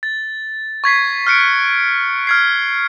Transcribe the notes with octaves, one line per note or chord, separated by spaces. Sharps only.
A6
C#6 G#6 B6 C7
F6 F#6 C#7 D7
F6 G#6 C7